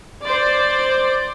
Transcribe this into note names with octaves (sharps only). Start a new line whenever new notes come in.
C5 D5